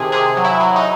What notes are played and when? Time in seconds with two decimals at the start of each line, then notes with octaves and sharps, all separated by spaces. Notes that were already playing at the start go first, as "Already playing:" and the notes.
Already playing: C3 D#3 G#4 A4
0.12 C3 G#4
0.37 F#3
0.45 E4
0.60 F#3
0.76 D#4